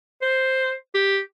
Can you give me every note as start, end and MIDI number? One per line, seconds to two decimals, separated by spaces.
0.22 0.72 72
0.94 1.20 67